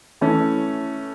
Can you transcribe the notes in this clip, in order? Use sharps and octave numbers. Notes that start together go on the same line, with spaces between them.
E3 A3 C#4 E4